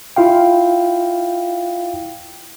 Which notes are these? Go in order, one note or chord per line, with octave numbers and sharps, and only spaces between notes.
E4 F4 F5 G5